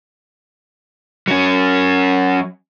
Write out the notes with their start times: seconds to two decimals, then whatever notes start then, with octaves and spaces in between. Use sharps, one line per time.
1.28 F#3 C#4